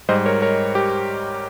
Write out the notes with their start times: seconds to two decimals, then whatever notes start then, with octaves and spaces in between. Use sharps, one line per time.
0.09 G#2 G3 C5 D#5
0.26 A#4 C#5
0.42 A#4 C#5
0.75 G4